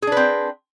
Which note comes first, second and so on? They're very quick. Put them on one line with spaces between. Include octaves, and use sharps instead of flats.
G#4 D4 B4 C4